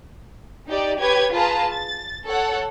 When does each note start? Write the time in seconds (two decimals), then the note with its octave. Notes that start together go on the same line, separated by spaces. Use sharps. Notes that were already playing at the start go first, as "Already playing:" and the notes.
0.68 D#4 G4 D5
1.00 G4 B4 C#5 G#6
1.33 F4 G#4 B4 A5 A#5
1.71 A6
2.25 A4 C#5 F#5